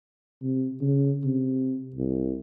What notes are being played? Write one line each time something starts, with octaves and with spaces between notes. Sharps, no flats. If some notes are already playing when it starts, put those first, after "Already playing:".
C3
C#3
C3
C2